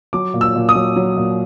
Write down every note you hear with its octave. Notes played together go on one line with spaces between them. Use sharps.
F#3 D6
A#2
E6
A#2
D#6
F#3
F#3
A#2